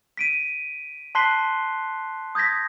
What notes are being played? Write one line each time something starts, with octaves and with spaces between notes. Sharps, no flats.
B6 D7 D#7
A5 C6 F#6 B6 C7 G7
D#6 G6 G#6 A#6 B6